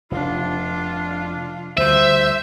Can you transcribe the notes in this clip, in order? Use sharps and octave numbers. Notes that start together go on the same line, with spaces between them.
F1 D4 F4
D2 G3 C5 E5